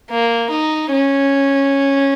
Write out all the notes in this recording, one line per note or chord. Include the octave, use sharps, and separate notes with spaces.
A#3
D#4
C#4